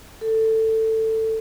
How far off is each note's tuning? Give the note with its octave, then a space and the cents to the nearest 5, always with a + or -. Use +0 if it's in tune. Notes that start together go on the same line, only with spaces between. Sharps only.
A4 +15